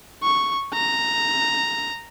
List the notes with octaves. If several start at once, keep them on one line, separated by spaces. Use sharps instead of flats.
C#6
A#5